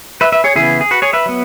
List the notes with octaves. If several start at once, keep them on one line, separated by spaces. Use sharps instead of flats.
B4 E5
B4 E5
G#4 C#5
C#3 E3 B3 E4 G#4
G#4
F#4 B4
G#4 C#5
B4 E5
F#3 B3